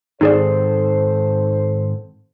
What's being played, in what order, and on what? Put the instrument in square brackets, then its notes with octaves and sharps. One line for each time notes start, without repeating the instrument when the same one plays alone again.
[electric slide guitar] G#2 D#3 C4 [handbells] D#4 G#4 D5 [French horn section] A4 C5